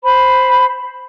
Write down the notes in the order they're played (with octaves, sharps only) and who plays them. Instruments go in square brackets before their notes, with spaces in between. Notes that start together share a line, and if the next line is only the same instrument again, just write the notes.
[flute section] C5 B5